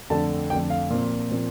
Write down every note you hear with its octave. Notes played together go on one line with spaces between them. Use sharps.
F2 D3 A3 D4 A5
F2 D3 A3 D4 G5
F5
A#2 F3 C4
A#2 F3 C4